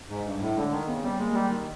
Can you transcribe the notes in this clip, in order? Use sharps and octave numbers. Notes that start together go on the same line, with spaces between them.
G#2
G2
A2
D3 G#3
D#3
C#3 B3
G3 B3
G#3 A#3
G3
D#3